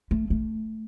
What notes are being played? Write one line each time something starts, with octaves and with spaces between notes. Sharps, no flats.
A3
A3